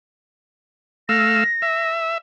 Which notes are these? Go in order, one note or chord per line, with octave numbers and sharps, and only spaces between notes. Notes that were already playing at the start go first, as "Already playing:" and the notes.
A3 F5 E6 A#6
E5